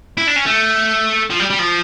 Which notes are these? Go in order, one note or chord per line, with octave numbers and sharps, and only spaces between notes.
E4
D4
C#4
A3
F3
G3
G3
F3